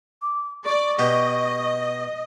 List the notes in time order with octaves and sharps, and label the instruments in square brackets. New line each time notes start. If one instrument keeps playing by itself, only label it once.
[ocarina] D6
[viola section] D5 [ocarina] C#6
[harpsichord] B2 G4 [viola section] D#5